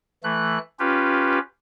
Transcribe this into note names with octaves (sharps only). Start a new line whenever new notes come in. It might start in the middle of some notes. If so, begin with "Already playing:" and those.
E3 A3 F#6
C#4 F4 G4 B4